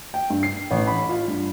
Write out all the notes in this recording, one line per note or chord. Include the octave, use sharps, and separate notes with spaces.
G5
G2
C7
A1
B5
F4
G2